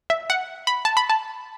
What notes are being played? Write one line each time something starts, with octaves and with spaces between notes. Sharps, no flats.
E5
F#5
B5
A5
B5
A5